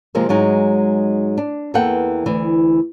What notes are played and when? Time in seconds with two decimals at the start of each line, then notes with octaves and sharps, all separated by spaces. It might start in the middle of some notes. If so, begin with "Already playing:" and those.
0.15 C3 F3 G#3 A#3 C4
0.29 G#2 F#3 G#3 D#4
1.38 D4
1.74 E2 E3 A#3 A4 F#5 G5
2.26 D2 E3